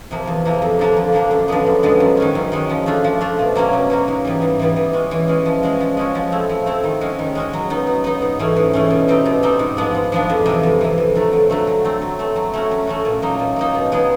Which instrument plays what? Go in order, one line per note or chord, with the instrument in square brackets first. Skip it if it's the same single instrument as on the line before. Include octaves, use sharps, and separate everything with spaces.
[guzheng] C3 F3 A#3
E2
C3 F3 A#3
F2
D3 F3 A#3 D4
F2
D3 F3 A#3 D4
F#2
D3 F3 G#3 B3
F#2
D3 F3 G#3 B3
F#2
D#3 G#3 C#4
F#2
D#3 G#3 C#4
F3
A3 D4 F4
F3
A3 D4 F4
B2
F#3 A#3 C#4 F#4
B2
F#3 A#3 C#4 F#4
G#2
E3 G3 B3
G#2
E3 G3 B3
E3
G#3 C#4
E3
G#3 C#4
F3
G#3 C#4 F#4
F3
G#3 C#4 F#4
F3
A3 C4 E4
F3
A3 C4 E4
D#3
G#3 C#4 F#4
D#3
G#3 C#4 F#4
F#3
B3 D#4
F#3
B3 D#4
G#2
E3 A3 C#4
G#2
E3 A3 C#4
B2
G3 C4 D#4
B2
G3 C4 D#4
G#2
F3 G#3 B3 D4
G#2
F3 G#3 B3 D4
F2
C3 E3
F2
C3 E3
F2
D3 F#3 A3
F2
D3 F#3 A3
F#3
A3 C4
F#3
A3 C4
F#3
A3 C#4 F#4
F#3
A3 C#4 F#4
A#2
F#3 A#3 D#4
A#2
F#3 A#3 D#4
B2
G#3 B3 D#4 G#4